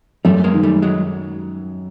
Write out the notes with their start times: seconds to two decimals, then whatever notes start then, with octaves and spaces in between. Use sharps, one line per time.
0.25 F#2 G3 A3
0.44 G#3 A#3
0.54 D#3
0.63 G3 A3
0.82 F#3 G#3